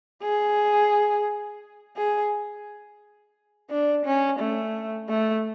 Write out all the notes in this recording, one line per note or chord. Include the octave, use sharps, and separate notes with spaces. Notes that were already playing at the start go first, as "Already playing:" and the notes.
G#4
G#4
D4
C#4
A3
A3